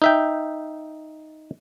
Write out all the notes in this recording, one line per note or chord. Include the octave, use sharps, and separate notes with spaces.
D#4 E5 G5